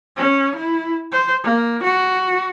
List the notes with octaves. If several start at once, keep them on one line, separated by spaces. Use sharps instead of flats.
C#4
E4
C5
A#3
F#4